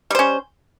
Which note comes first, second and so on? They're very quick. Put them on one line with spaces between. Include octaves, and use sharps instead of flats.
G3 C5 C#4